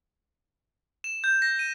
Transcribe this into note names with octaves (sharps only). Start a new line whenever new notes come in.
E7
G6
A#6
D#7